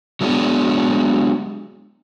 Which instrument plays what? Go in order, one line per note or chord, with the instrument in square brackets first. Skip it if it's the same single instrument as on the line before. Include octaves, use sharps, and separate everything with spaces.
[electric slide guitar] F#3 G#3 A3 B3 D4 G#4